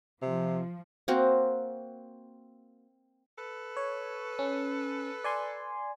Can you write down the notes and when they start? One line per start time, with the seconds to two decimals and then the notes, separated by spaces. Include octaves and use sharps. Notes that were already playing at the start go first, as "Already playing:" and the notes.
0.22 C3 F3
1.08 A#3 C4 F#4
3.38 A4 B4
3.77 C#5
4.39 C#4
5.24 D5 G#5 C6